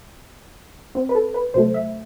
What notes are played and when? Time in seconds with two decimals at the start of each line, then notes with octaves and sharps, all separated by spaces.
0.95 C4
1.09 B4
1.15 A4
1.34 B4
1.54 C3 F#3 A3 C5
1.74 E5